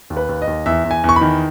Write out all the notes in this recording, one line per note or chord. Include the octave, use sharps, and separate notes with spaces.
D#2
B4
D#2
D#5
D#2
E2 E5
E2
G#5
E2 C#6
B5
D#3